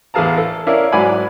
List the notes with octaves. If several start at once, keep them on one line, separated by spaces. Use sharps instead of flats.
A1 E2 G#4 F5 A5 A#5
A4
C#4 E4 A#4 D5 F5
G#2 F#3 D5 F#5 G#5 B5